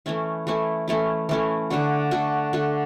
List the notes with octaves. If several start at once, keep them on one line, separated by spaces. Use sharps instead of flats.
E3 A3 C#4 E4
E3 A3 C#4 E4
E3 A3 C#4 E4
E3 A3 C#4 E4
D3 A3 D4 F#4
D3 A3 D4 F#4
D3 A3 D4 F#4